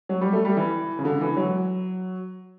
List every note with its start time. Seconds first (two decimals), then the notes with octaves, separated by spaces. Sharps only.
0.09 F#3
0.21 G3
0.33 A3
0.45 G3
0.57 E3
0.99 C#3
1.05 D3
1.21 E3
1.37 F#3